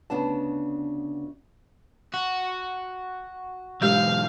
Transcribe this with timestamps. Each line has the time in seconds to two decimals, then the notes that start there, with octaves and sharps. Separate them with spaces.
0.10 D2 C#3 B3 D4 A5
2.14 F#4
3.82 B1 G#2 G#3 G4 F5 G6